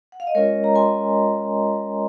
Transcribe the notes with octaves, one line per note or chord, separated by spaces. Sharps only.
F#5
F5
D#5
G#3 C#4 F4 A#4 C#5
A#5
G#5 C6